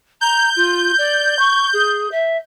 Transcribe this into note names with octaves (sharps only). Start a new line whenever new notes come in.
A#5 G6
F4
D5
C#6
G#4
E5